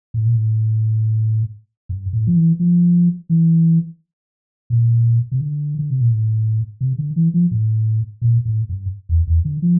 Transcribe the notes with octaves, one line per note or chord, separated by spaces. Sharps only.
A2
A#2
A2
G2
A2
F3
E3
F3
E3
A#2
C3
D3
D3
C3
A#2
A2
C3
D3
E3
F3
A2
A#2
A2
G2
E2
E2
D3
F3